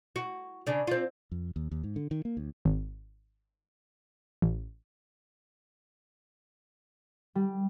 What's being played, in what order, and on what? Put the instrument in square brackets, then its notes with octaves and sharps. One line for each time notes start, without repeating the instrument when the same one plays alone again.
[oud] F#4
C#3 D4
C4 F4
[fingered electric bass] F2
D#2
D#2
G#2
D3
D#3
A#3
D2
[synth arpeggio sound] G#1
A1
[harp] G3